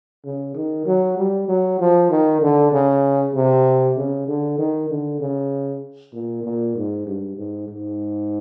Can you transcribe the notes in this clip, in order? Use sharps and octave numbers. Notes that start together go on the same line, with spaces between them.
C#3
D#3
F#3
G3
F#3
F3
D#3
D3
C#3
C3
C#3
D3
D#3
D3
C#3
A#2
A#2
G#2
G2
G#2
G#2